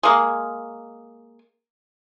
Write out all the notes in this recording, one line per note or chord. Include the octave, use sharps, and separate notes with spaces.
G#3 A#3